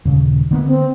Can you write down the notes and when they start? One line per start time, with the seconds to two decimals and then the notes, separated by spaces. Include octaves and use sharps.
0.05 D#1 C#3
0.51 D3 A#3 B3
0.67 C4